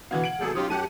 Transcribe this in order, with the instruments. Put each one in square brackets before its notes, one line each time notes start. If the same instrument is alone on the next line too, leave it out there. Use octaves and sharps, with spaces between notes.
[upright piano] B2 D3 E3 [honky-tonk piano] F5 G#6 [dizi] F#5
[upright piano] D7 F#7
[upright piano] G#1 B2 C#7 [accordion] G#4 A4
[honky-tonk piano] F#3 C#4 D#4 [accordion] F4 [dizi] G4 [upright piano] D#6
[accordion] F#2 G4 F#5 [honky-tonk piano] F#3 A3 [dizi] A5 [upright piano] D#7